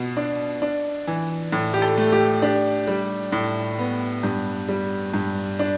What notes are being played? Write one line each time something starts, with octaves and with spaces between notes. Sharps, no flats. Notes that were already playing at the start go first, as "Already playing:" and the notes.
Already playing: B2 B3
D4
D4
E3
A2
G4
A4
A3
G4
D4 G4
G3
A2
B3
G2
G3
G2
D4